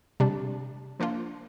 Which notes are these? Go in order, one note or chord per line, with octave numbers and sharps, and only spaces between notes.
C3 G3 D4
F3 A#3 D4 F4